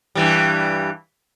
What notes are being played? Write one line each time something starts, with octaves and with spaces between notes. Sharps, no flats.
G2 E3 G3